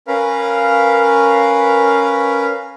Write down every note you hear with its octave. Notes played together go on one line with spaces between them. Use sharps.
C#4 A#4 B4 F5